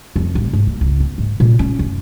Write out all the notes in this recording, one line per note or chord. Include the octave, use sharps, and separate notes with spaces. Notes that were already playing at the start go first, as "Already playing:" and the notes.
F2
A1
G#2
A#3
C#2
B3
G#2
A#2
C#4
F#2